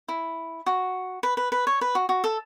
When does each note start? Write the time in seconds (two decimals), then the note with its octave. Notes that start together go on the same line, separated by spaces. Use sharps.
0.08 E4
0.66 F#4
1.23 B4
1.37 B4
1.52 B4
1.67 C#5
1.81 B4
1.95 F#4
2.09 F#4
2.24 A4